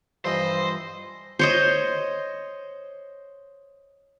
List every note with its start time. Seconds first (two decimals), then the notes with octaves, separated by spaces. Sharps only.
0.25 G2 E3 F3 E4 C5 D#5
1.39 C5 C#5 D#5